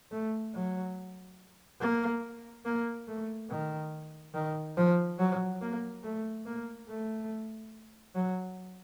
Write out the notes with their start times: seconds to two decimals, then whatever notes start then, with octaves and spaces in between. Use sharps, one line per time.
0.11 A3
0.54 F#3
1.81 A#3
2.65 A#3
3.07 A3
3.50 D#3
4.34 D#3
4.77 F3
5.19 F#3
5.61 A#3
6.03 A3
6.46 A#3
6.89 A3
8.15 F#3